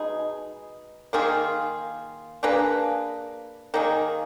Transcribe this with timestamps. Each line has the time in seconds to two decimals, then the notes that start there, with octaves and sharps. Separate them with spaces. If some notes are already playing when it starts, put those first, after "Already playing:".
Already playing: B2 G#3 D#4 G#4
1.13 D#3 A#3 F4 G#4
2.43 A#3 D4 G#4 B4
3.74 D#3 A#3 D#4 G#4